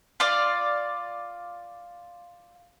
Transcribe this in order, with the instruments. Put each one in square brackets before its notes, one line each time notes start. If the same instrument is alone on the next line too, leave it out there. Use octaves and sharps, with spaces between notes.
[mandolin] F4 D5 F5